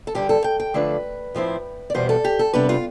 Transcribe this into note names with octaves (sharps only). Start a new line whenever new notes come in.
A4
G2 D3 G3 G4
A4
G5
G5
D3 F3 A3 D4 B4
A2 F3 C4 E4
D5
E2 B2 G3 B3 C5
A4
G4
A4
C3 G3 B3 D4 B4
F4